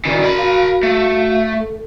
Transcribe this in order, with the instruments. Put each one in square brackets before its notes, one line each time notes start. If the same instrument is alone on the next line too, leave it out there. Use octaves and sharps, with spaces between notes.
[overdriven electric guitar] D#3 E3 [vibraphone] C#4 F#4 D5
[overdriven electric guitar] A#4 B5
[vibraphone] F#4 F5
[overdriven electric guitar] A3
[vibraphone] A4